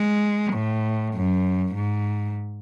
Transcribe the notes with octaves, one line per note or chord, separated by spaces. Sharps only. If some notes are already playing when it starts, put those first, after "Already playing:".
Already playing: G#3
A2
F#2
G#2